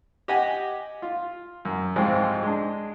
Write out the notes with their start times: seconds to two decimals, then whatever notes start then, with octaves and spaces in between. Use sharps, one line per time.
0.28 G4 D#5 F#5 G#5
1.02 F4
1.65 F#2
1.96 C2 G#2 F3 G#3 C4
2.43 G#3 D4